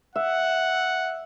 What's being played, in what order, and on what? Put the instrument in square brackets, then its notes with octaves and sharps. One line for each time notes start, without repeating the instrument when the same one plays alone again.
[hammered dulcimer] E5 [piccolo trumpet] F#5